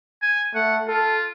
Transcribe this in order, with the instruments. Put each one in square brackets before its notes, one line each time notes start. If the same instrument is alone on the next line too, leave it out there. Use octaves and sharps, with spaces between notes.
[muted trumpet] G#5
[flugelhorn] A3 [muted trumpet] F#5
[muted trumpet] F4 [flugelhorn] A4